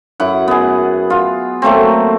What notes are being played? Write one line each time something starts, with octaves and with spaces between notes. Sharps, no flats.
F#2 E4 F#5
B3 G#4
F4
F#3 A3 A#3 C4